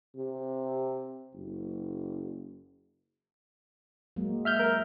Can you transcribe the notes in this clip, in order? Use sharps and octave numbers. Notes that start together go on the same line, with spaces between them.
C3
F#1
F#3 G#3 A#3
E5 F6 G6
A#4